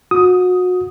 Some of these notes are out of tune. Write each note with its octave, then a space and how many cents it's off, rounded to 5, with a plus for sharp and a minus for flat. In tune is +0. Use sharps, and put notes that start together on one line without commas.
F#4 -30 D#6 +10